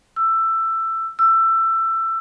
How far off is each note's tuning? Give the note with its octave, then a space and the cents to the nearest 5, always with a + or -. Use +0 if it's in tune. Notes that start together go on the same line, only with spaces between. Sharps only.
E6 +15
E6 +20